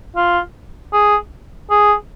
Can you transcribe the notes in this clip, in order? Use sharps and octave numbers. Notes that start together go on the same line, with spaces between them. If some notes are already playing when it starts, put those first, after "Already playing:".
F4
G#4
G#4